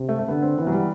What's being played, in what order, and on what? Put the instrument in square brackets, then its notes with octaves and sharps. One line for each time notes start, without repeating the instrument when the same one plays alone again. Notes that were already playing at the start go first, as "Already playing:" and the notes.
Already playing: [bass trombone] C3
[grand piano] A3
A3
[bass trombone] D3 [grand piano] B3
[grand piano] C4
[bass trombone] E3 [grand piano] B3
[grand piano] F#3
G3